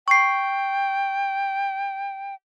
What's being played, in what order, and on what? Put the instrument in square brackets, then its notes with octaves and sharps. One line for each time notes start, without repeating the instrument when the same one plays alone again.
[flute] G5 [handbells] C#6 C7